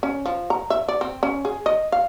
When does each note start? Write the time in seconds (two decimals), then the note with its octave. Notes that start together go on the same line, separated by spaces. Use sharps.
0.03 C#4
0.26 F3
0.50 A#5
0.70 E5
0.88 D5
1.01 C4
1.23 C#4
1.45 G#4
1.66 D#5
1.92 F5